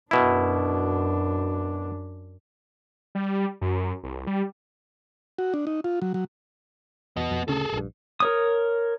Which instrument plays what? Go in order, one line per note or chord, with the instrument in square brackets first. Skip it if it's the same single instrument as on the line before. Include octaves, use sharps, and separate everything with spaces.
[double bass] F#2 D4 [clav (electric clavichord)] B2 E4
[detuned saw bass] G3
F#2
C2
G3
[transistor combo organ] F#4
D4
D#4
F4
F#3
F#3
[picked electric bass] E2 [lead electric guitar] B3 D#5
[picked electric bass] F2
[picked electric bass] D2 C#3 C#4 [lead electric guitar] G#4 A4
[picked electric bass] A#1 G2
[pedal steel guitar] A#4 C#5 D#6